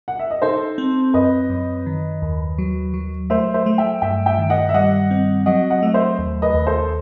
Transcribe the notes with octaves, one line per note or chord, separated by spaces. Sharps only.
F#5
E5
D#5
D#4 A4 C5
C4
F#2 B4 D#5
F#2
D#3
D#2
F#3
F#3
A3 C5 E5
C5 E5
A3
E5 G5
G2 E5 G5
E5 G5
D#3
D#5 F#5
E5
G3 D#5 F#5
C4
F#3 D#5 F#5
D#5 F#5
A3 D#5
C5 E5
D#2
B4 D#5
D#2
A4 C5